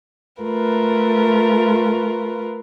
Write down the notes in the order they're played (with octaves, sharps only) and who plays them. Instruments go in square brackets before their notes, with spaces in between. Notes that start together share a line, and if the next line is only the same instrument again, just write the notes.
[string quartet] A3 F4 A#4 B4